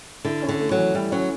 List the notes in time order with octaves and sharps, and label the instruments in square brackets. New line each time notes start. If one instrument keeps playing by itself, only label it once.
[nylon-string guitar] D3 [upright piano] E4
[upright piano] C#4
[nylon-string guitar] D3
[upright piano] A3
[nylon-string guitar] F#3
[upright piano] E3
[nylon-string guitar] G3 [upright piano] E4
[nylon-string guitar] F#3 [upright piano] C#4